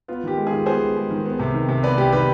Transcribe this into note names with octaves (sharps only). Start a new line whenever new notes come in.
B3 F4
D#3 G4
G#3
F4 G#4
D#3
B3 G#4 C5
D#3
G#3
D#3
B3
C3
D#3
C3
B3 B4 D5
C3 G4
D#3 G4 B4